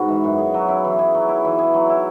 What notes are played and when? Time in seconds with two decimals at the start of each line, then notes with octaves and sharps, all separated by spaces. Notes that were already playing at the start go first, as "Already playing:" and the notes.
Already playing: G#2 B2 B3 F#4 G#4
0.08 E3
0.24 F#2
0.38 G#4
0.54 F#3
0.68 E4
0.84 E3
0.99 G#4
1.15 F#3
1.29 E4
1.45 E3
1.59 G#4
1.74 F#3
1.90 E4